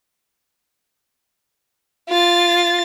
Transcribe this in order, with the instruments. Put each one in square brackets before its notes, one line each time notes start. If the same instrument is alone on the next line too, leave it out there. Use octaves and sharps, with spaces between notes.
[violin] F4 A6